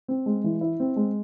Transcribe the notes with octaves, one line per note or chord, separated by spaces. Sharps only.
C4
G#3
E3
E4
C4
G#3